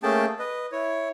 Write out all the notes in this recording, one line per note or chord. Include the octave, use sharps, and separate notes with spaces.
A3 A#3 C#4 G#4 G5 A5
B4 D#5
E4 C#5